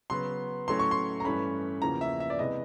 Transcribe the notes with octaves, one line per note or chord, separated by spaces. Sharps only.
C#3 F#3 B3 C6
A2 F#3 A3 C#4 C6
C#6
C6
A#5
G2 E3 A3 C#4 B5
E2 C#3 F3 A#3 A#5
E5
E5
D5
C3 E3 G#3 B3 D#5